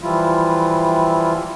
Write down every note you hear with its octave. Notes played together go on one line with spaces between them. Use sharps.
E3 F3 G3 E4 F4